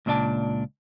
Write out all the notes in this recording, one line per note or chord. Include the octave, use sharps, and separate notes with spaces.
C#2 A#2 D4 D5 A5